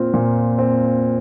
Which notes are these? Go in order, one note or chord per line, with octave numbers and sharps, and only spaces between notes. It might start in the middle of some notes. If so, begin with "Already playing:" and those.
Already playing: A#2 C4 F4
A#2
C4